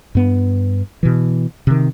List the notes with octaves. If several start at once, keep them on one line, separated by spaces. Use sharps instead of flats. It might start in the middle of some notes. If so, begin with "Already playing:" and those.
G2 B3
B2 E3
C3 D#3